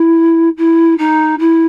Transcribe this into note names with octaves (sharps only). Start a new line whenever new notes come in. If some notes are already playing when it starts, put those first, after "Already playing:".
Already playing: E4
E4
D#4
E4